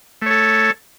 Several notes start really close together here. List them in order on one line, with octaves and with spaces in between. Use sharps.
A3 C#5 A4